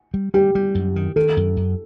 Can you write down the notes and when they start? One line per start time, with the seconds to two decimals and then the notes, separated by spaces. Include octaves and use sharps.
0.14 G3
0.34 G3 G4
0.55 G3
0.75 F#2
0.96 D#3
1.16 D#3 A4
1.37 F#2
1.57 F#2